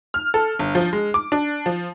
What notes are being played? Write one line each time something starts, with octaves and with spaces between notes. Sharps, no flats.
F6
A4
G1
F3
G#3
D6
D4
F3